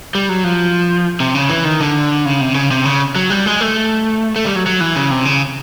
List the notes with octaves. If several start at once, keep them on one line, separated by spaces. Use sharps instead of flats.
G3
F#3
F3
C3
C#3
E3
D#3
D3
C#3
C3
C#3
C3
C#3
F#3
G3
G#3
A3
A3
G3
F#3
F#3
E3
C#3
C3
C#3